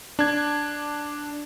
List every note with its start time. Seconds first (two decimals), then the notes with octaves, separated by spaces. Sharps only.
0.19 D4 G#6